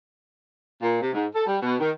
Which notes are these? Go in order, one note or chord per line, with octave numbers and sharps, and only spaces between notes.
A#2
C3
G#2
A4
G3
B2
D#3